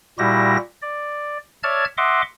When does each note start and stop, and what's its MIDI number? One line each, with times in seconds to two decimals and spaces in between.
0.19 0.57 46
0.19 0.57 55
0.19 0.57 64
0.19 0.57 66
0.19 0.57 67
0.19 0.57 94
0.82 1.38 74
1.63 1.85 73
1.63 1.85 74
1.63 1.85 76
1.63 1.85 81
1.63 1.85 89
1.63 1.85 92
1.98 2.22 75
1.98 2.22 76
1.98 2.22 78
1.98 2.22 84
1.98 2.22 86